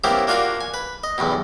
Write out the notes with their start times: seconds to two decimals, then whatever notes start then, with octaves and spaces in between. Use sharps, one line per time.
0.04 A#3 B3 C#4 E4 G4 C5
0.27 A#3 D4 F4 F#4 F5
0.61 G#5
0.74 B4
1.04 D#5
1.18 B1 E2 G2 B2